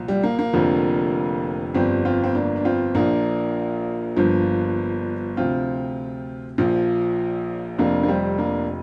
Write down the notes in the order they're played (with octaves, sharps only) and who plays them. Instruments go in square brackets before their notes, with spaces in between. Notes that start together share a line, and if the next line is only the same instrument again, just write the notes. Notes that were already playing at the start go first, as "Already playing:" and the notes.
Already playing: [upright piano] C2 A#2 F3
G3
A#3
A#3
F1 F2 D3 F3
G1 F2 F3 G3 C4
C4 F4
C4
A#3 D4
D4
C4 F4
A#1 A#2 F3 A#3 D4
G1 G2 F3
D2 C3 F3 C4 F4
A#1 A#2 F3
F1 F2 F3 A#3 D4
A#3
G3 C4
A#3 D4